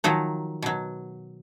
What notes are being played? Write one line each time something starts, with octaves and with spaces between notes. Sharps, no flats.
D#3 F3 F#3 D#4
B2 F#3